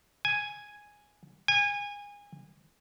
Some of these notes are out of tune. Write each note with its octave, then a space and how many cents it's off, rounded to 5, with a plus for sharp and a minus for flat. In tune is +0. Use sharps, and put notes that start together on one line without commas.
G#5 +0
G#5 -25